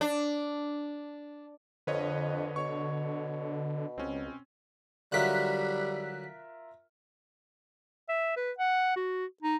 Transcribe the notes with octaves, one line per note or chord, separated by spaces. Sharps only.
D4
F2 D3 B4 C#5 D#5
B2 C#5 C#6
C#2 C4 C#4
D3 F#3 G3 F4 A#4 E5 F#6 B6
E5
B4
F#5
F#4
D#4